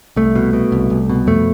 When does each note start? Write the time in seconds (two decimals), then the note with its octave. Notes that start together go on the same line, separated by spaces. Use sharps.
0.16 C2 A3
0.35 B2
0.53 B2
0.72 C2
0.90 C2
1.09 B2
1.27 F2 A3